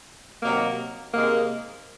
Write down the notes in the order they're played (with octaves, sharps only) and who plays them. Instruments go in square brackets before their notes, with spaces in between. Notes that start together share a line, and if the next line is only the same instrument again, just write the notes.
[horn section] C3 D#3 F#3 A#3
C3 D#3 G#3 A#3